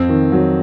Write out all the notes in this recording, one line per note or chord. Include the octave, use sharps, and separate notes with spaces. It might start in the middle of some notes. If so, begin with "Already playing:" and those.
Already playing: F2 C4
D#3
F#3